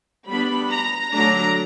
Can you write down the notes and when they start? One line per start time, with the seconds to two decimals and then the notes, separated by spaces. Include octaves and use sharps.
0.27 G3 B3 D4 B5
0.69 A#5
1.11 D3 F#3 A3 D4 A#5